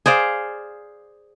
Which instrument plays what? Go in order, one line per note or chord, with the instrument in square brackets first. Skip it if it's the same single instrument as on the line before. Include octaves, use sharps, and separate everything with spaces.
[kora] G#4 C5 D5 F5